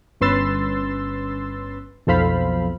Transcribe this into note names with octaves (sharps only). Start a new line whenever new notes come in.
G1 C#4 B4 C6 E6 A6
B1 F2 A4 C5 F5 B5